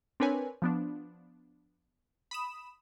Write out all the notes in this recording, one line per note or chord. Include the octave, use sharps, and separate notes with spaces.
C4 D4 A#4 B4 C#5 G#5
F3 B3 D4
B5 D#6 E7